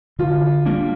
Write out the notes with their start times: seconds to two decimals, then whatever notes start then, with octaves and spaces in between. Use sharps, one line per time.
0.19 D3 F4
0.66 G3 A#3 D4